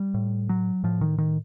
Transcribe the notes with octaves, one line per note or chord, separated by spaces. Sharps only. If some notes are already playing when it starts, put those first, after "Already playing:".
Already playing: G3
A2
F#3
A2 F3
D#3
D#3